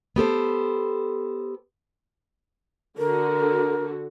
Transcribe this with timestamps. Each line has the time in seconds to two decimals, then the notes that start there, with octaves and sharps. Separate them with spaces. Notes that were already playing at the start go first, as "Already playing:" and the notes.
0.16 B3 G4 A4 C5
2.98 D3 F#4 A#4